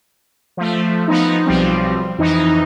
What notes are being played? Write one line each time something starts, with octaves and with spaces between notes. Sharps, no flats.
F3 A3
F3 B3 D#4
B1 F3 G3 C4
F2 E3 D#4